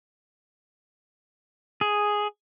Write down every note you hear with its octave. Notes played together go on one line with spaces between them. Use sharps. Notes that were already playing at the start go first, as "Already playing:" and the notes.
G#4